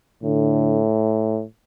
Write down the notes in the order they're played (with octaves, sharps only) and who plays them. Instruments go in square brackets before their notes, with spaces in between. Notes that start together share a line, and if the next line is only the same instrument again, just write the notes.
[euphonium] A2 [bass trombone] D3